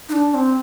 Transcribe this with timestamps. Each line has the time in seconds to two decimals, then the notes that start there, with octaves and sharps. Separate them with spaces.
0.09 D#4
0.13 D4
0.34 C4